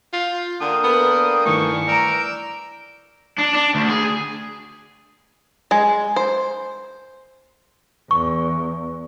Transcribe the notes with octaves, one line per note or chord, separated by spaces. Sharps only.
F4 G6
D3 A#3 D4 G5 D#6
B3 A4 A#4
G2 D#3 E3 A3 C#6
A#4 D5 A#5 D6 E6 G6
D4
D4
D2
G#4
G#3
C5
E2 C#6